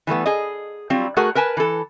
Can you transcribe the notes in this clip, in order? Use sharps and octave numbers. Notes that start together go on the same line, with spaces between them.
E3 G3 A3 B3
G#4 D#5
F#3 G3 C4 F4
A3 F#4 G#4 A#4 F#5
A#4 B4 G#5 A5
E3 A4